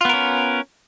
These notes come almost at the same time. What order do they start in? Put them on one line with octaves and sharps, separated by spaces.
F4 B3 A#4 C#4